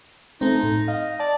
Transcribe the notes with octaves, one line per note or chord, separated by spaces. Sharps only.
A3 C4 D#4
A2
D#5 F5
D5 A5